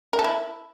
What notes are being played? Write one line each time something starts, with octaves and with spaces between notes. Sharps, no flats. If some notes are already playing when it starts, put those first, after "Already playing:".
A#4
A4
E4